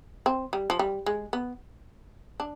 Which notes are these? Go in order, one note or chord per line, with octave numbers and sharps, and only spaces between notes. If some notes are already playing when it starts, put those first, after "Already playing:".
C4
G3
F3
G3
G#3
B3
D4